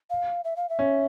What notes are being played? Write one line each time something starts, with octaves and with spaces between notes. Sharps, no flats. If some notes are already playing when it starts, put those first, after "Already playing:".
F5
E5
F5
E5
C#4